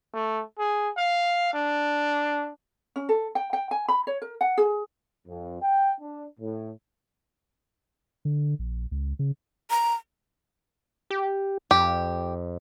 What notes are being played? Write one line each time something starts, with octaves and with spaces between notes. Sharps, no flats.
A3
G#4
F5
D4
C#4
A4
G5
G5
G#5
B5
C#5
A#4
F#5
G#4
F2
G5
D4
A2
D3
A#1
C#2
C#3
A#5
G4
F2 G4